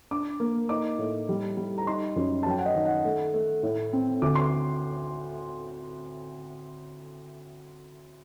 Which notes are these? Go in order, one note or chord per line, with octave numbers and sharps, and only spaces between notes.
D4 D6
A#3
D#4 D6
A2
G3
G3
A#5
D#4 C6
F#2
A5
F#3 G5
F#5
D#5
D#3
F#5
A3
A3
A2
C4
D2 D6
C6